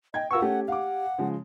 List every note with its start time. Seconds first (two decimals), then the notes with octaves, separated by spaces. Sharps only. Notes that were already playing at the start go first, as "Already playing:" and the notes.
0.14 D#5 G5 G#6
0.31 F4 A#4 B4 F#5 C#6 E6
0.42 A3 C#4 G4
0.68 F5 F#5 D6
1.18 C#3 F3 G#3